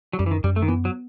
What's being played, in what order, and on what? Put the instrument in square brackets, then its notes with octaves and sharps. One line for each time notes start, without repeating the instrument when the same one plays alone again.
[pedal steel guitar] F#3
[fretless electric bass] F#2 [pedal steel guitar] G3
[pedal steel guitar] E3
D#3
[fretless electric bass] F#2 [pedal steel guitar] G3
[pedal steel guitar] A3
D#3
[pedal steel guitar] E3 [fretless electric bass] B3
[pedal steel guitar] F#3